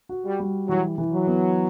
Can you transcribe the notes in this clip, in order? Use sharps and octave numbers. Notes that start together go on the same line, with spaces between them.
F#4
G3
G3
E3 F#3
E3
F#3
B3